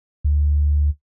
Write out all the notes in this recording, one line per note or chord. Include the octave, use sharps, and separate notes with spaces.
D2